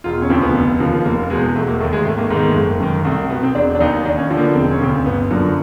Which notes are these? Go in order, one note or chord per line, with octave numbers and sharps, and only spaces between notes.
E1 F4
C#4
D2 C#3 F3 C4
B3
F1
D#2 C#3 F3
F1 A#3
E2 B2 G#3
E1 A3
A#3
D#2 D#3 A3
G#3
G#1 A3
A#3
G#2 D#3 B3
A#3
G#3
F#1 A3
F#2 D#3
C2 A3
B2 B3
C4
E1 D4
D4
D#2 D#3 D#4
D#2 D4
C#4
D3 F3
A#3
B3
E1 C4
C#4
D2 C#3 C4
G1 B3
F#2 D3 F3 A#3